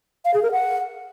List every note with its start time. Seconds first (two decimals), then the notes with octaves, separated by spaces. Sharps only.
0.25 F5
0.34 G#4
0.43 A#4
0.52 F#5